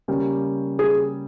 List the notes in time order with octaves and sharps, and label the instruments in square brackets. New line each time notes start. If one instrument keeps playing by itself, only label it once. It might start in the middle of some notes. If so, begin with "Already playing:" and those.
[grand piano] C#3 G3 A#3 C#4 G4
[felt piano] G#4